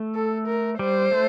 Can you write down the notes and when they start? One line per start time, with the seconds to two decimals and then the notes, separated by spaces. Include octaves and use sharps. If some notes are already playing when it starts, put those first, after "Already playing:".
Already playing: A3
0.15 A4
0.48 A#4
0.79 G3 C5
1.12 A3